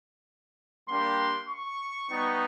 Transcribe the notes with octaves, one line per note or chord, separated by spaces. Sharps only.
G3 A#3 D4 G4 C6
C#6
G3 B3 D#4